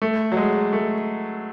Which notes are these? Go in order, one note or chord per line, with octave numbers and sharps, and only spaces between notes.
A3
F#3
G#3
A3